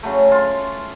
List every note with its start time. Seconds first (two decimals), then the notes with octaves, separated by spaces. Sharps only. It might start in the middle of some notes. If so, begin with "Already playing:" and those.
0.03 C#3 F#3 A3
0.31 F4 C6